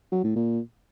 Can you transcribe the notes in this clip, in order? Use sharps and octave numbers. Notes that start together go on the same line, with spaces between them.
F#3
A2
A#2